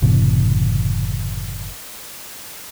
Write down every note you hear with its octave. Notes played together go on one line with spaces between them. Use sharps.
F#1 A2 C3 E3